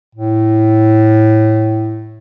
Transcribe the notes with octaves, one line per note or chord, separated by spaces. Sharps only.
A2